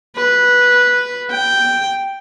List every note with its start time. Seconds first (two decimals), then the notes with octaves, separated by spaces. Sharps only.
0.17 B4
1.32 G5